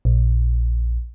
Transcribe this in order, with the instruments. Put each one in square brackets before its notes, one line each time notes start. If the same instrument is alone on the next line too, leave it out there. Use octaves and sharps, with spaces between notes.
[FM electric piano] A#1